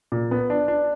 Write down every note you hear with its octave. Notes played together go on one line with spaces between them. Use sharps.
A#2
B3
D4
D4